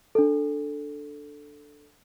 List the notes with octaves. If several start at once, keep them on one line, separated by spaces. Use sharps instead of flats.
D4 A4